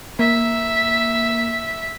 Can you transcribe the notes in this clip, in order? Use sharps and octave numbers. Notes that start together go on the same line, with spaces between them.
A#3 E5